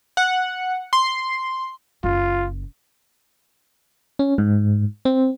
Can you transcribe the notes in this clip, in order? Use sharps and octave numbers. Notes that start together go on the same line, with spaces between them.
F#5
C6
F#1 F4
C#4
G#2
C4